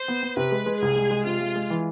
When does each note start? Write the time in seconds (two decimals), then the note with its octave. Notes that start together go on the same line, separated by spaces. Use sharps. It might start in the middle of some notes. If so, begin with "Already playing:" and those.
Already playing: C5
0.08 B3
0.23 B3
0.37 C3 B4
0.51 G#3
0.66 G#3
0.81 C2 G#4
0.96 G#3
1.11 G#3
1.25 C3 F4
1.40 G#3
1.56 G#3
1.70 E3